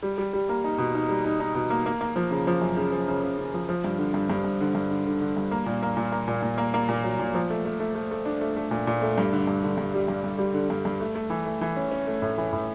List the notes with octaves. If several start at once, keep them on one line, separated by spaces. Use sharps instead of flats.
G3
G3
G3
A#3
D#4
B2
D#4
G3
D#4
D#4
B2
A#3
A#3
A#3
F3
C#3
F3
F#2
C#3
F3
C#3
C#3
C#3
F3
F3
G2
D3
G2
G2
G2
D3
G2
D3
D3
D3
G2
A#3
A#2
A#3
A#2
A#3
A#2
A#2
A#3
A#3
A#2
F#3
A#2
F3
A3
A3
A3
A3
A3
D4
A3
A3
A#2
A#2
A3
G2
D3
G2
D3
G2
G3
G2
G2
G3
D3
G2
G2
A3
A3
E3
A3
E3
C#4
C#4
A3
A2
E3
A2